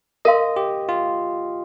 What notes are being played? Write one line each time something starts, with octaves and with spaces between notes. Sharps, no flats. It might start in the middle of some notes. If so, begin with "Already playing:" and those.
A#4 D#5 F5 C6
G4
F4